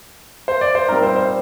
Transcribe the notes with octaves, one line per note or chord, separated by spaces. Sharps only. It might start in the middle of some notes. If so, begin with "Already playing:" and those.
C5
D5
C5
A#2 G3 C4 D#4 A#4
C5
C5